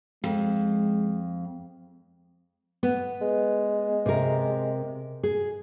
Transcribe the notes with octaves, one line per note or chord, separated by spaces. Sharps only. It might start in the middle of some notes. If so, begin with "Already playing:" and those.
F2 G#3
B3
G#3
C3 A#4
G#4